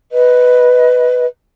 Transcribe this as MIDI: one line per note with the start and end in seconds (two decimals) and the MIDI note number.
0.11 1.24 71
0.11 1.24 75